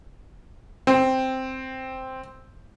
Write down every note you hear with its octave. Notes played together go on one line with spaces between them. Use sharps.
C4